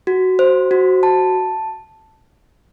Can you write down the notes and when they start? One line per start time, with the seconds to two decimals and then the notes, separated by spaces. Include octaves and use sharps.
0.07 F#4
0.39 C5
0.71 F#4
1.03 A5